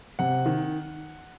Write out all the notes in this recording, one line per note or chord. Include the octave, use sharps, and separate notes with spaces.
C3 F#5
D#3